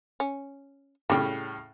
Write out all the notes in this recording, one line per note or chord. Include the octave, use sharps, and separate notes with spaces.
C#4
A2 C#3 G3 G5